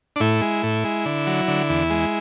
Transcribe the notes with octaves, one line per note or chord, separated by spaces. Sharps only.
D4
A2 E4
G#3
A2
G#3
D3
F#3
D3
E2
G#3